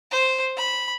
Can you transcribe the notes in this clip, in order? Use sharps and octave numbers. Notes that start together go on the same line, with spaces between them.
C5
B5